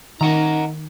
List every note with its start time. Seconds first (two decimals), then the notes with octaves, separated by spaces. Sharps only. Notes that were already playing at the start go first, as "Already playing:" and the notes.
0.21 D#3 D#4 A#4 F#5 A#5